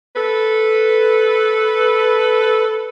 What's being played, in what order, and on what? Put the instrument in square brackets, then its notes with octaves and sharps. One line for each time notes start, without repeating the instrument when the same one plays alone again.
[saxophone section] A4 B4